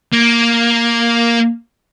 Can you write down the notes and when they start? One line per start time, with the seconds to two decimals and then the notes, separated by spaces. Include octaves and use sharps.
0.13 A#3